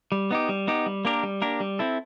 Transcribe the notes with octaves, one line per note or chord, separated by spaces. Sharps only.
G3
B3 D#4 G4
G3
B3 D#4 G4
G3
A#3 D4 G4 A#4
G3
A#3 D4 G4 A#4
G3
C4 E4 A4